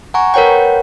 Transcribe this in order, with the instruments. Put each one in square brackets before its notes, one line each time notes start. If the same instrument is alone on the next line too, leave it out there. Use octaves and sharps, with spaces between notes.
[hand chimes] F#5 G#5 A#5 C#6
A#4 B4 C#5 F#5 G5